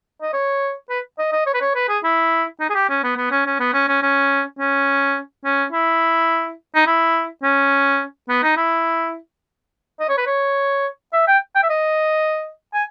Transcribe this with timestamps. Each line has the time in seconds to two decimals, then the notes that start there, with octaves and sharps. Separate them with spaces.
0.22 D#5
0.33 C#5
0.90 B4
1.18 D#5
1.32 D#5
1.46 C#5
1.54 B4
1.61 C#5
1.75 B4
1.89 G#4
2.04 E4
2.60 D#4
2.70 G#4
2.75 G4
2.89 C#4
3.03 B3
3.17 B3
3.31 C#4
3.46 C#4
3.60 B3
3.73 C#4
3.88 C#4
4.02 C#4
4.59 C#4
5.45 C#4
5.72 E4
6.75 D#4
6.86 E4
7.43 C#4
8.29 B3
8.43 D#4
8.57 E4
10.00 D#5
10.09 C#5
10.17 B4
10.26 C#5
11.13 E5
11.28 G5
11.55 G5
11.63 E5
11.70 D#5
12.74 G#5